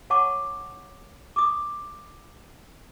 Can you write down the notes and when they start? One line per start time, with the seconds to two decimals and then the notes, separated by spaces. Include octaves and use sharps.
0.10 C#5 F#5 A5 C#6 D6
1.36 D6 D#6